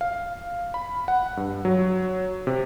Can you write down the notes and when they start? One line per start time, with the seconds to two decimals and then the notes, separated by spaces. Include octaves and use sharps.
0.01 F5
0.74 B5
1.08 F#5
1.37 G2
1.65 F#3
2.47 C3